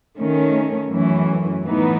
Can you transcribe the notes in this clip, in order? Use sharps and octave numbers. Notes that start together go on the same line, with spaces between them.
D#3 A3 C#4
F#2 E3 A3 C#4
A2 E3 B3 D#4